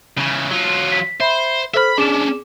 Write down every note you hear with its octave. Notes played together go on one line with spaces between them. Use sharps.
C#3 E3
F#3 F4
B6
C5 E5 B5
A4 C5 E5 B5 F6
C#4 D4 G#4 D6 E7